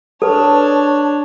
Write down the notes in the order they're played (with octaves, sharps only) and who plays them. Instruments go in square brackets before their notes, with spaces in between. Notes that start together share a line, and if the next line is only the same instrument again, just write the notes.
[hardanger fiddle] D4 C#5 [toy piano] A4 B4 [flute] A5